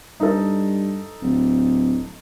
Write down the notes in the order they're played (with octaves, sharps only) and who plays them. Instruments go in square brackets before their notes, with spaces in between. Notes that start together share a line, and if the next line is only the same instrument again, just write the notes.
[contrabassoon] G2 [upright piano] D#4 A4
[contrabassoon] D1